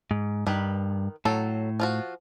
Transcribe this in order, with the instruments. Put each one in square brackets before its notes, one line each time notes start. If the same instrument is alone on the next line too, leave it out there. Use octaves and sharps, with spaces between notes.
[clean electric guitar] G#2
[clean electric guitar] G2 [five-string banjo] D#3 B4
[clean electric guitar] A2 [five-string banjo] F#3 A4
[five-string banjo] F3 F4 F#4